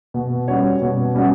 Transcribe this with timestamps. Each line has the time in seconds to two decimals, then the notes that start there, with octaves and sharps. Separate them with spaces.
0.14 B2
0.48 G3 C#4 F#4 C#5
0.82 B2
1.15 G3 C#4 F#4 C#5